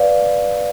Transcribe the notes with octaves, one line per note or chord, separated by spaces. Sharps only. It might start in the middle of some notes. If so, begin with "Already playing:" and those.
Already playing: B4 D5 F5